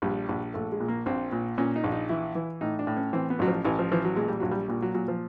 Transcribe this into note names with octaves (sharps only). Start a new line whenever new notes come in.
A#1 G3
A#1
A#1 A3
G#3
A#2
A#3
A#1 C4
A#2
A#2 C#4
D#4
A#1
D#4
E3 E4
E3
A2 D#4
D4
A2
C#4
E3 C4
B3
A1 F#3
F3
A1 E3
F3
E3 F3
F#3
A#2 G#3
G3
A#1 F#3
G3
A#2 G3
F#3
A#2 F#3
F3